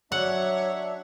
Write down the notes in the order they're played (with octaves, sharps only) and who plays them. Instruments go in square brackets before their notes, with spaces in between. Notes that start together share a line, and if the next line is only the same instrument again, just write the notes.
[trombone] F#3 [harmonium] D4 E5 [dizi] C#5 [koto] F#5